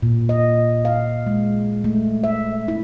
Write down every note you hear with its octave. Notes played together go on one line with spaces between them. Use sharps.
A#2
D#5
F5
G#3
A3
E5
E4